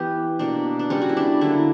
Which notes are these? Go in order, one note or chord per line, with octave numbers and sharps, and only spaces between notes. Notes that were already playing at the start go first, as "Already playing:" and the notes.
Already playing: E3 B3 G4
B2 A#3 D4
D4
C#3 G3 B3 C#4
F#4
E4
D4
D3 F#3 A#3 E4